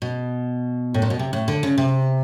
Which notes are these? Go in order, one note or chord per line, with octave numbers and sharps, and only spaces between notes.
B2
A2
A#2
B2
C3
A2
D3
C#3
C3